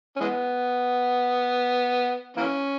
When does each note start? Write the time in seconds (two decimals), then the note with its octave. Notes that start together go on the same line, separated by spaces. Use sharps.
0.16 C#4
0.20 E3 G#3 B3
2.37 E3 A#3 C#4